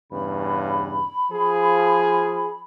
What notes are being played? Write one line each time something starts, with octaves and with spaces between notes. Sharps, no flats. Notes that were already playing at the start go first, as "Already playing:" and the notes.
E2 G2 C#3 B5
F3 G#4